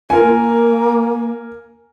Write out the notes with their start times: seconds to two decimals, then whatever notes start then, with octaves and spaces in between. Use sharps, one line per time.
0.10 F4 A#4 G#5
0.23 A#3